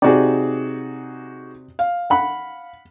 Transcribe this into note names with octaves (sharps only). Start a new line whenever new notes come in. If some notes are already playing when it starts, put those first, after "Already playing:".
C3 D#4 F#4 G#4 D5
F5
F#5 B5